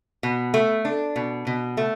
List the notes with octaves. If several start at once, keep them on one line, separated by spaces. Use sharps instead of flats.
B2
A3
D4
B2
B2
A3